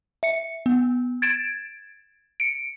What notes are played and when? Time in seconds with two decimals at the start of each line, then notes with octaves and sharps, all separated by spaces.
0.23 E5 C#7
0.66 B3
1.22 G#6 A6 D7 E7
2.40 C#7 D7